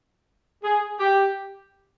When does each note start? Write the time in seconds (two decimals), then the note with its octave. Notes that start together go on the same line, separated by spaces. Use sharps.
0.63 G#4
1.00 G4